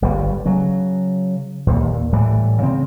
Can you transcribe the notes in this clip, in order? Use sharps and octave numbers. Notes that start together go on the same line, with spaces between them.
G1 G3
C#3 F#3
D#2 A#2
A2 E3 G3
C#3 C4